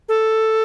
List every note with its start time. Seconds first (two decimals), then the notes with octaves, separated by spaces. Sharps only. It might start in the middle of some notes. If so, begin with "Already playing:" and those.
0.09 A4